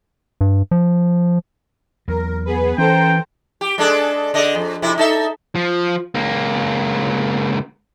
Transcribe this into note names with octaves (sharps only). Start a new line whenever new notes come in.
G2
F3
E2 F#3 A#4
B3 G#4 B4
E3 C#4 A4 C5 G5 A#5
G4
G#3 D4 A4
D3 D#5
F2
F2 C3 E4
D#4 A4 E5
F3
C#2 A#3